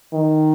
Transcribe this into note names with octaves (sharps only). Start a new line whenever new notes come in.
D#3